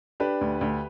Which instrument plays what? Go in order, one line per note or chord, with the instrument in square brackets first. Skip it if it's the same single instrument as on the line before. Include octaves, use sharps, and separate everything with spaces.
[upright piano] D4 G4 B4
D2
D2